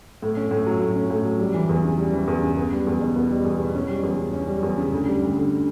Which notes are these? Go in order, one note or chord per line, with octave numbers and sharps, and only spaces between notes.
A2
C#4
A2
F#3
A2
C#4
A2
F#3
G3
E3
E2
C#3
G3
E3
E2
C#3
B3
G3
E2
B2
B3
G3
E2
B2
C#4
G3
E2
C#3
C#4
G3
E2
C#3
D2
G3
D2
D3